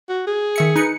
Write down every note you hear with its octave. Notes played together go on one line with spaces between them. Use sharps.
F#4
G#4
D#3 E5 C#7
D#4 B4 C#7